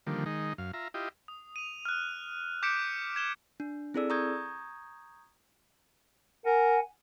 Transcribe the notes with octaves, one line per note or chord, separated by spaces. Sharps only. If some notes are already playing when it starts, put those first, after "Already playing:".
D3 D#3 F3 G3 A#3
D#3 G#3 D#4
F#2 F5
F4 E5 A#5
E4 F4 G4 D#5
D#6
D#7 F7
F6 F#6
D6 G6 B6 C#7 D7 E7
G#6 E7 G7
D4
C4 E4 G#4 A4 D5 E6
A#5 C#6 D#6 G6 G#6
A#4 F#5 G#5